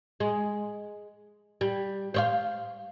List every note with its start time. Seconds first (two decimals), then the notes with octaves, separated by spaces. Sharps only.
0.20 G#3
1.61 G3
2.14 C5 C#5 F5